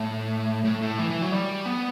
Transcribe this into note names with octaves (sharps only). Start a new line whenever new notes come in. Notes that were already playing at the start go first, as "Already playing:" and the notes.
Already playing: A2
A2
A2
E3
E3
F#3
G3
B3